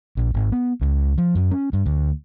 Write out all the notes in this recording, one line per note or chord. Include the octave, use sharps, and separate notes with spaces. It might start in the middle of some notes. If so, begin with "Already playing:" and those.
A#1
G#1
B3
C#2
F3
F#2
C#4
G2
D2